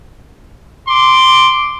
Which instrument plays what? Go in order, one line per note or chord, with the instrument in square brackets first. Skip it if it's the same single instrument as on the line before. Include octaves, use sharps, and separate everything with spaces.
[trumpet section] C6 D6